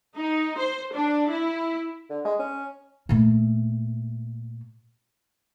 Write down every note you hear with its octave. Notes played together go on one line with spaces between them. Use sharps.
D#4
C5
D4
E4
D3
G#3
C#4
A#2 A3